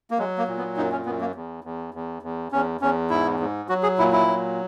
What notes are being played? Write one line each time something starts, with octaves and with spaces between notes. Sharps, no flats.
A#3
F#3 G#3
A#3
A#2
B3
F#2 D#4
C#4
F#2 B3
A#3
E2
E2
E2
E2
E2 C#4
E2 C#4
G#2 E4
G#2
F#3 F#4
G#4
A#2 E4
E4
F#3